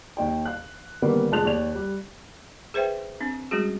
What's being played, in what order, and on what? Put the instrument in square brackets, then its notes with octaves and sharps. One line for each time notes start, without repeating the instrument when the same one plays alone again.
[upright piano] D#2 D#4 G5
F5 F#6
D3 D#3 G3 A#3 B3 C#4
F1 F3 G#3 A5 F#6 F7
D#2 D5 F7
G3
[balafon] G#4 B4 C5 E5 G5
C4 D4
G3 G#3 C#4 F#4 G#4